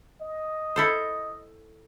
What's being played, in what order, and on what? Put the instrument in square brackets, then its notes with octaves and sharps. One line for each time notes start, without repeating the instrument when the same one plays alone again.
[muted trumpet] D#5
[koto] E4 A4 C5